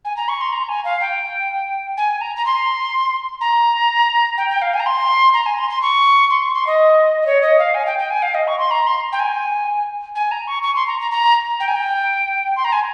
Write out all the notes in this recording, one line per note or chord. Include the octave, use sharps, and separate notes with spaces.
G#5
A#5
C#6
C6
A#5
G#5
F5
G5
G#5
A#5
A#5
C6
A#5
G5
G5
F5
G#5
A#5
C6
A#5
G#5
C6
C6
C#6
C6
C#6
C6
D#5
D#5
C#5
D#5
F5
G#5
G5
G5
G#5
F5
D#5
C#6
C6
A#5
C6
G5
G#5
G#5
A#5
C#6
C#6
C6
A#5
A#5
A#5
G5
G#5
G5
C6
A#5
G#5